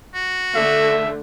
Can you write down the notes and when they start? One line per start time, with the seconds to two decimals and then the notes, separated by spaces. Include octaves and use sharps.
0.14 F#4
0.54 D3 A3 E5